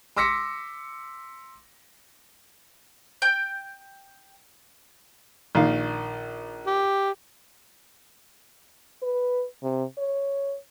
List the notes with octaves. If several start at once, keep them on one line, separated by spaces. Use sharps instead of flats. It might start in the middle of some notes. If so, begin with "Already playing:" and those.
C6 D6 E6 A#6 B6 C#7
G5 G6
A#1 D#3 F5
G4
B4
C3
C#5